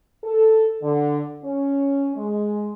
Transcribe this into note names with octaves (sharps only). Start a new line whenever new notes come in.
A4
D3
C#4
G#3